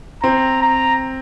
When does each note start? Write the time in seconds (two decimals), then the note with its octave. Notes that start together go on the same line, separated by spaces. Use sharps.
0.23 C4 A#5
0.62 A#5